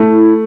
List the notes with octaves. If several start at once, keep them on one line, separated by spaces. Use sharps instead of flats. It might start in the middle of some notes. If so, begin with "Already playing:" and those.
Already playing: A3 E4